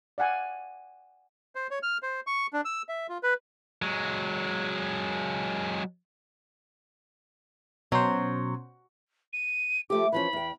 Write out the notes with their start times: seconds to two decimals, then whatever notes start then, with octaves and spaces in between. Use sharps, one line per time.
0.18 D5 F5 F#5 G#5
1.55 C5
1.71 C#5
1.83 F6
2.02 C5
2.27 C#6
2.53 D4
2.65 E6
2.89 E5
3.09 F4
3.23 B4
3.82 F#3 G#3
7.92 B2 F#3 C#4 C5
9.33 D#7
9.90 F3 A3 G4 D6
10.12 E3 F3 C#4 B5
10.33 E2 G5